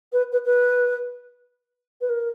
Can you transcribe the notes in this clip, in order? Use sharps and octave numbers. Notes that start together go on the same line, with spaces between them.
B4
B4
B4
B4
A#4